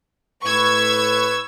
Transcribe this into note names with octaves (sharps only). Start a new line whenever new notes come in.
A2 B4 C#6 E6 G#6